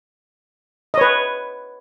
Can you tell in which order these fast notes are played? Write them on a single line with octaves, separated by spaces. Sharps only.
D#5 C#5 B4